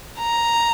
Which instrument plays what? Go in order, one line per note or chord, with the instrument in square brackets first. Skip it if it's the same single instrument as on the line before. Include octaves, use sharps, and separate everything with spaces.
[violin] A#5